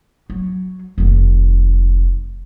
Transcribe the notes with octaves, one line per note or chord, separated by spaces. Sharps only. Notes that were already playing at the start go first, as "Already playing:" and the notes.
F#3
F1 D#3